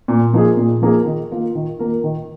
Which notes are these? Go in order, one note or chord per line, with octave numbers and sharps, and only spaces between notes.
A#2
F3 A#3 D#4 G#4
A#2
F3 A#3 D#4 G#4
D#3
A#3 F4 A#4
D#3
A#3 F4 A#4
D#3